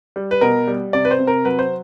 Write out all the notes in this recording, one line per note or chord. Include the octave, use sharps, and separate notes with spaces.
G3
B4
B2 A#4
G3
C3 D5
B4
C5
C3
A#4
F#3 B4
C5